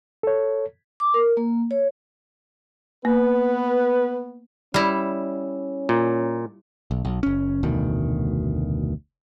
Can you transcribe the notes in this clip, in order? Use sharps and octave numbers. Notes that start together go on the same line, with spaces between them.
A4 C#5
D6
A#4
A#3
C#5
A#3 B3 B4
G3 C#4 E4
A#2
B1
B1
F#1 C#4
F1 D2 B2 D#3